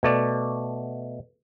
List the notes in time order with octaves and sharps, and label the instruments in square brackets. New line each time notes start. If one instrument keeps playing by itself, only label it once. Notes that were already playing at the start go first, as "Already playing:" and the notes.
[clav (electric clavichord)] B2 A3 D5